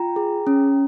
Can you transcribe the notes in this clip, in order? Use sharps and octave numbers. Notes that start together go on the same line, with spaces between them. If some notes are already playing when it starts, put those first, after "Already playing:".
Already playing: F4 G5 A#5
G#4
C#4